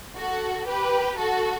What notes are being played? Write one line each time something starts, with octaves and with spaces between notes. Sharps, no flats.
F#4 A4
G4 B4
F#4 A4